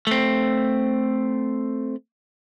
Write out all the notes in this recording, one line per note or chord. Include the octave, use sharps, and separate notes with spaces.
A3 C4